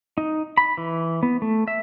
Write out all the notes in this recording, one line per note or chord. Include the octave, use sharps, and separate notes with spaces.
D#4
B5
E3
B3
A3
E5